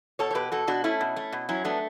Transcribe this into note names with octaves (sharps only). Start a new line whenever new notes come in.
B2 A4 C#5
C#5
B2 G4 B4
B2 F#4 A4
B2 D4 F#4
A3 C#4 E4
B2
A3
B2
F#3 C#4 E4
A3 B3 D4